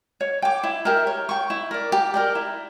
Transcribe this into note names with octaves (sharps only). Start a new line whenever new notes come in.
C#5
G5 D6
E4
G4 A#4 E5
C#5
G5 C#6
E4
A#4 D5
G4
A#4 D5 G5
E4